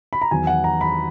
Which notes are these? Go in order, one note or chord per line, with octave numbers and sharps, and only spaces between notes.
B5
A#5
E2 D#3 F#3 B3 G#5
F#5
A#5
B5